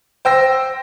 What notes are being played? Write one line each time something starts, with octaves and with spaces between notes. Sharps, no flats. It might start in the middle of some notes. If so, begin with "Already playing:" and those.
C5 G5 E6 A#6